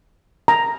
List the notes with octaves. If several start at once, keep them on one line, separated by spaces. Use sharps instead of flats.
A#5